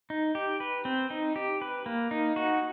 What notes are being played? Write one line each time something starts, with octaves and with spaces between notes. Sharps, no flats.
D#4
G4
B4
C4
D#4
G4
B4
A#3
D#4
F#4